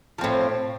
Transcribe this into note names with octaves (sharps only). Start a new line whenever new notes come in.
A2 F3 C4